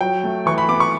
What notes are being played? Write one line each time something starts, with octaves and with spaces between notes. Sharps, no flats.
F#3 G5
A3
E3 C#6
B5
B3 D6
C#6